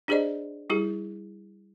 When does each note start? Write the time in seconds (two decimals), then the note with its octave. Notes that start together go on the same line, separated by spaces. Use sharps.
0.08 D4 G4 G#4 C5 D5 D#5
0.70 G3 E4 G4 G#4